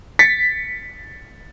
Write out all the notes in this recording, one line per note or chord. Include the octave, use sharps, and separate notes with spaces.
A6 B6 C#7